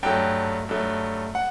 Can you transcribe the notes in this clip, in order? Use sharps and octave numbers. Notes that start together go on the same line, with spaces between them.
G2 F#3 A3 G5
G2 F#3 A3
F#5